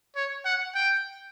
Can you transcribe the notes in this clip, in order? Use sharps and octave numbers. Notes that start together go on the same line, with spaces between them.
C#5
F#5
G5